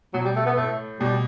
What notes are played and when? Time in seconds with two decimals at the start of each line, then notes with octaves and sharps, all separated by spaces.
0.14 B2 F#3
0.25 G3
0.36 A3
0.46 B3
0.57 A2 A3
1.00 B2 G3